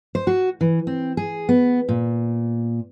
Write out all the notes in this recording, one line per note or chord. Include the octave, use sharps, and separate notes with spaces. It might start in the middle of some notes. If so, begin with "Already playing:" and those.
C5
F#4
E3
C4
G#4
B3
A#2